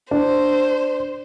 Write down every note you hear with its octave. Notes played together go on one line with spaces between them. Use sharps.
D4 C5